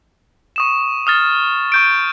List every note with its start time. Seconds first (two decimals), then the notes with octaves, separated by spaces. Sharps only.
0.56 C#6 D#6 E7
1.07 D#6 F6 A6
1.72 C#6 G6 D7